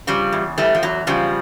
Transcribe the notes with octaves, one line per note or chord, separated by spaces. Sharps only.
C#3 F3 G3
E2
E3 G3 A3
F3
E2 F#3
C#3 F3 G3